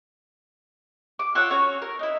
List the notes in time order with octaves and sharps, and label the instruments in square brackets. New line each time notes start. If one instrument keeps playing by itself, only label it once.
[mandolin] D6
F4 A4 C#5 F#5
C#4 F#4 C#5
A#4
D#4 E4